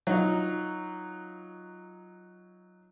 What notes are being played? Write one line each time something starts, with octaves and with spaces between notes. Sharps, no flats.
F#3 D#4 F4